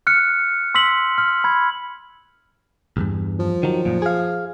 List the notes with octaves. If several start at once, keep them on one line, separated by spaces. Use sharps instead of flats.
F6 F#6 C#7
C6 E6 B6 F#7
F6
B5 G#6
B1 E2 G2
F3
D#3 F#3
F#2 A#2
G#4 F5